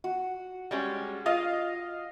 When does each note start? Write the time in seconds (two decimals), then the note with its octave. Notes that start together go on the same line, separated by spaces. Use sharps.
0.04 F#4
0.71 G3 G#3 C#4
1.26 F4 D#5 F5